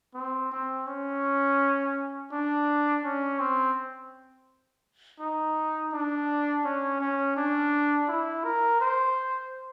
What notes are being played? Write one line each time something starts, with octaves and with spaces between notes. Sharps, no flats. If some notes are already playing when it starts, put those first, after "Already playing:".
C4
C4
C#4
D4
C#4
C4
D#4
D4
C#4
C#4
D4
E4
A#4
C5